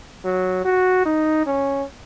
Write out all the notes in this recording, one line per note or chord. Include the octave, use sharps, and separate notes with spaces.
F#3
F#4
D#4
C#4